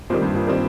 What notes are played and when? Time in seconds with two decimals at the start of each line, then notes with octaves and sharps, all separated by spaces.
0.10 A#2 D#3 G3 C4
0.22 G2
0.34 A#2
0.47 D#3 G3 C4